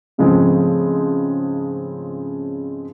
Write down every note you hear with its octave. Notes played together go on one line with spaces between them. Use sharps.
G#2 C#3 F3 G#3 A3 C4